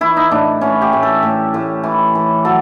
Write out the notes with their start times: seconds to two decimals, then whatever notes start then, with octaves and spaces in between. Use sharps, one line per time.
0.01 E3 E4
0.17 D#4
0.31 A2 D4
0.61 E3 C#4
0.82 G4
0.93 A2
1.03 A4
1.23 A2
1.54 A2
1.84 E3
2.15 E3
2.45 F#3 A4